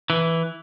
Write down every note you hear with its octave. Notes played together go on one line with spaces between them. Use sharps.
E3